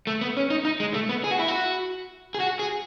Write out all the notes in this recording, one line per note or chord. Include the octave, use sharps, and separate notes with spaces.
A3
B3
C#4
D#4
D#4
G#3
A3
B3
G#4
F#4
E4
F#4
G#4
F#4
G#4